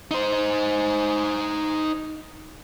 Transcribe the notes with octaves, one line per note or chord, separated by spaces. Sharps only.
D#4 C5